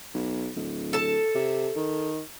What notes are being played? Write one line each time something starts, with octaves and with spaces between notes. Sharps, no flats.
B1
D1
A4 A5
C3
D#3